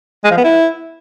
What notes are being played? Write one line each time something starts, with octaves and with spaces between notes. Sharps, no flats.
G#3
F3
B3
E4